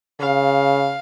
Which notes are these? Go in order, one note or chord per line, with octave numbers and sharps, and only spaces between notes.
C#3 F5